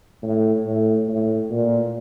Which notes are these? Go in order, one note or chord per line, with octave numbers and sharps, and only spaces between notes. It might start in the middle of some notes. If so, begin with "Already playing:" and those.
A2
A2
A2
A#2